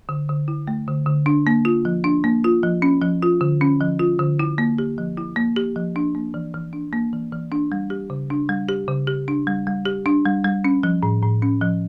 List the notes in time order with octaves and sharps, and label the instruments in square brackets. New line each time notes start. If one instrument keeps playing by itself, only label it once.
[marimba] D3
D3
E4
A3
D3
D3
D4
A#3
F4
F3
D4
A#3
F4
F3
C#4
F3
F4
D3
C#4
F3
F4
D3
E4
A#3
G4
F3
E4
A#3
G4
F3
D4
A#3
E3
E3
D4
A#3
E3
E3
D4
G3
G4
C#3
D4
G3
G4
C#3
G4
D4
G3
G3
G4
D4
G3
G3
C#4
F3
A2
A2
C#4
F3